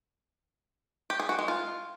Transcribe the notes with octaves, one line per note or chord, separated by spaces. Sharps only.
G4
G#4
F#4
G#3
F4